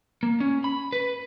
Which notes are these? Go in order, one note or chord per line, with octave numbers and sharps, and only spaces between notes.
A#3
C#4
B5
B4